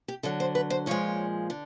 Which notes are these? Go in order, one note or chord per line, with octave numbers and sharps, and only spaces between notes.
G4
D3 F#3 A4
C5
B4
C5
A#2 F3 G#3 C#5
D3